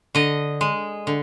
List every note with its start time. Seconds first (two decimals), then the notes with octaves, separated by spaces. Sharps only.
0.15 D3 D#5
0.61 G#3
1.07 D3